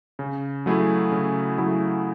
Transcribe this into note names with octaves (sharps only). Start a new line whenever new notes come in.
C#3
F#3 A3 E4 G#4
C#3
F#3 A3 E4 G#4